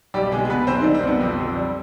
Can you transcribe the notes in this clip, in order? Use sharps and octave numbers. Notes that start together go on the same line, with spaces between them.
B1 G3 G4
B2 G#3 G#4
G#4
B2 B3 B4
B1 C4 C5
D#3 G3 D#4
C4
B1 B3
F2 C4
F2
G3